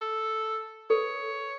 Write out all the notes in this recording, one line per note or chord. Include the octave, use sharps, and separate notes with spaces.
A4
A4 B4 C#5